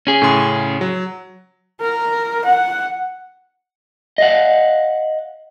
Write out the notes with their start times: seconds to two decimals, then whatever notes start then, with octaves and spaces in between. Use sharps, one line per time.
0.07 C#4 G#4
0.22 A2 C#3 C6
0.81 F#3
1.81 A#4
2.45 F#5
4.18 D#5 F5 F#5